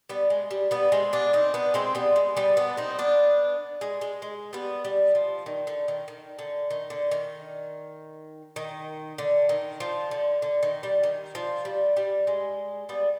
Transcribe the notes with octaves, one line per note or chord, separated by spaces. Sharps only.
G3 B3
G#3
G3
G3 B3
G#3 C4
B3 D4
C4 D#4
B3 D4
G#3 C4
G3 B3
G#3
G3 B3
B3 D4
C4 D#4
B3 D4
G#3
G#3
G#3
G3 B3
G3
F3
D#3
D3
D#3
D#3
D3
D#3
D3
D#3
D#3
D3
D#3
F3
D3
D3
D#3
G3
D#3
F3
G3
G3
G#3
G3 B3